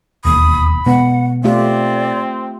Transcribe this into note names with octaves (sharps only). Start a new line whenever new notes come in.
E1 D#2 B5 D#6
B2 G#3 B3 F#5
A3 C4 F4 G4 D5